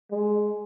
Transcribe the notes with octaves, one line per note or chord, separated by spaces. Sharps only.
G#3